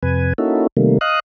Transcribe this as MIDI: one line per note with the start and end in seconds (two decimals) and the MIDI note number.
0.03 0.33 41
0.03 0.33 48
0.03 0.33 71
0.03 0.33 80
0.38 0.67 58
0.38 0.67 61
0.38 0.67 63
0.38 0.67 64
0.38 0.67 66
0.38 0.67 69
0.77 0.98 48
0.77 0.98 51
0.77 0.98 55
0.77 0.98 57
0.77 0.98 58
1.01 1.20 75
1.01 1.20 77
1.01 1.20 87
1.01 1.20 90